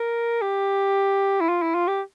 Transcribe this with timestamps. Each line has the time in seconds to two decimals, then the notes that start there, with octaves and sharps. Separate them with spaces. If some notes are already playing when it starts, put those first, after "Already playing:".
Already playing: A#4
0.42 G4
1.40 E4
1.49 F4
1.62 E4
1.75 F4
1.87 G4